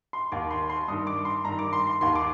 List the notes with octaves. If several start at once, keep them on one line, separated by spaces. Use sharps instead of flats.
C6
D#2 D#3 D6
C6
C6
G2 D#3 D#6
D6
C6
G2 D#3 A#5
D6
C6
C6
D#2 D#3 C6
D6